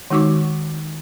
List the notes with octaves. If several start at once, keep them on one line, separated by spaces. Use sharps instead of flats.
D#3 G#3 D#4 F#4 C#6 D6